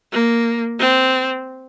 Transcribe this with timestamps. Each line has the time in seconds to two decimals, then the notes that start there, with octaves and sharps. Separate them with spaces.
0.12 A#3
0.79 C4